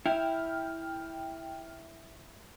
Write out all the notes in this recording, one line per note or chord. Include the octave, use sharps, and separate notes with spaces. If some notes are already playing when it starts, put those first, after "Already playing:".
E4 G5 F6